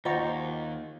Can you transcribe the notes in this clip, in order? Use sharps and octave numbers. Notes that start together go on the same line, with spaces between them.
D#2 F4 C5 D#5 F#5 A#5 C#6